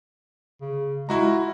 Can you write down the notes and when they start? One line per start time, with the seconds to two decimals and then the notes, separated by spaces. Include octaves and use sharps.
0.61 C#3
1.09 G#3 E4 F#4 A#5
1.20 F4